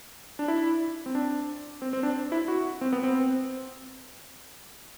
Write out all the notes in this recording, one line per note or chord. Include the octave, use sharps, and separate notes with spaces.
D4
E4
C4
D4
C4
C4
D4
E4
F#4
C4
B3
C4